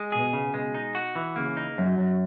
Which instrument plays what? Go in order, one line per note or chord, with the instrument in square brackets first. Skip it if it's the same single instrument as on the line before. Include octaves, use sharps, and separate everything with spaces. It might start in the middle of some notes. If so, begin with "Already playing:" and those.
Already playing: [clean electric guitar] G#3
[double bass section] B2 [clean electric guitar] G#4
[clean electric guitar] C#3
G#3
D#4
F#4
E3
[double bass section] C#3 [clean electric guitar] A#3
[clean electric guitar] D#4
[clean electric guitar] F#2 [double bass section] F#3
[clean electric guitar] F#2